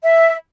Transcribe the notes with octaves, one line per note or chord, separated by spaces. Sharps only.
E5